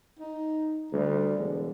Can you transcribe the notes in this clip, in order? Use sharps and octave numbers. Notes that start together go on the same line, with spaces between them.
D#4
D2 G3
E1